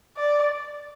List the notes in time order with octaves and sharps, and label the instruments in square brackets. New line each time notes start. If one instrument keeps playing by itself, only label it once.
[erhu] D5